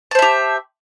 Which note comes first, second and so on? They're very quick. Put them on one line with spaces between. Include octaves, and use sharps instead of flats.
A5 C5 E5 G4